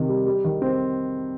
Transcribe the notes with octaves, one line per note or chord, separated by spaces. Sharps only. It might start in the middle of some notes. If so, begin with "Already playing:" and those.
Already playing: C3 D#3
G3
G3
D#3
C4